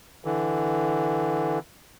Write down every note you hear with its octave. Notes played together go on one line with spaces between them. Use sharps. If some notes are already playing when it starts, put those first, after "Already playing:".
D3 E3